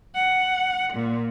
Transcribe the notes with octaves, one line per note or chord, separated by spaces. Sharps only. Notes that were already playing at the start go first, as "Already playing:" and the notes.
F#5
A#2